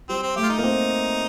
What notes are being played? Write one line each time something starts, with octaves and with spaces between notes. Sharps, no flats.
G3 C4
C4
A3 G4
F4
D#4
A#3
C4